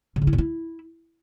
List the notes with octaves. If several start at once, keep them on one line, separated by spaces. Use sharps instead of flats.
C3
C#3
E4
B2
E4